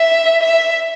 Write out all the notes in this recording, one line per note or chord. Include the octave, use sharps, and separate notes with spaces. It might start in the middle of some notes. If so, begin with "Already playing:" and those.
Already playing: E5
E5